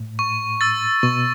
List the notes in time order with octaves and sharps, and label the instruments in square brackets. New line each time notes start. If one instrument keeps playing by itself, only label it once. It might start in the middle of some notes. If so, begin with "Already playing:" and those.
Already playing: [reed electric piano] A2
[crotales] C#6
E6 A6
[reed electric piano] B2 [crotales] C#6